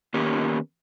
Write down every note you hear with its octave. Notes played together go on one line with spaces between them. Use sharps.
D#3 A#3 B3 C#4 G4 A#4